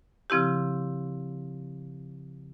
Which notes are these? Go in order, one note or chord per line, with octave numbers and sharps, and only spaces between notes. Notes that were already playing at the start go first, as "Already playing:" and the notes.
C#3 F3 C4 E4 G4